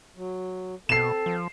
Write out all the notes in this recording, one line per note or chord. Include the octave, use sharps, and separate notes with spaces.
F#3
B2 C4 A4 C7 E7
F3